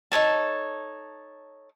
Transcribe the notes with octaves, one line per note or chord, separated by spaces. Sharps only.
D#4 A4 C#5 A5